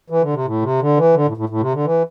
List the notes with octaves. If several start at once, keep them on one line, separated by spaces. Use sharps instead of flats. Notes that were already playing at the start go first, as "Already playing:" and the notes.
E3
D3
C3
A2
C3
D3
E3
D3
A2
A2
A2
C3
D3
E3